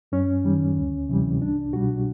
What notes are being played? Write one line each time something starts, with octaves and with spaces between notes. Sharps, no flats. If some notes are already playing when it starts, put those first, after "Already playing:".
F#2 C#4
D#3 G3
D2
C3 E3 G3
C2 D4
B2 G3 F#4